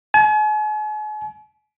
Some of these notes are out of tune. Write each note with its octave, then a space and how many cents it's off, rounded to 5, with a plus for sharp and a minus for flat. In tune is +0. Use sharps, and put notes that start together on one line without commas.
G#5 +40